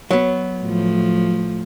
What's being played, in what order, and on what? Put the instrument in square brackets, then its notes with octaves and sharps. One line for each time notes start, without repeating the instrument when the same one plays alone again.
[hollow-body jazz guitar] F#3 B3
[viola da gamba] A2 F3